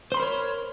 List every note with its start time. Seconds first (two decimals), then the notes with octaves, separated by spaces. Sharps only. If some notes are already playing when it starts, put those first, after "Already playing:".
0.12 C5
0.14 C6
0.17 B5
0.20 A#4
0.22 C#5